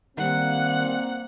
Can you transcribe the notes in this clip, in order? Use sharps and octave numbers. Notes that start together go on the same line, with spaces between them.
D#3 G3 A#3 C4 F#5